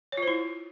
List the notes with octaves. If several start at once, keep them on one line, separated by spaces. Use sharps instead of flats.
C#5
F4
C5
E4